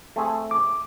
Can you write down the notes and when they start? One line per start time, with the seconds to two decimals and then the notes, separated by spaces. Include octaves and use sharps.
0.16 A3 C4 G#4
0.51 D6